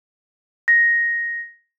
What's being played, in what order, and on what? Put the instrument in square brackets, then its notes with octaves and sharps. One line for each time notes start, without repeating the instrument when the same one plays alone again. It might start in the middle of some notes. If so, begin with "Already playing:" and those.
[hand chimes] A#6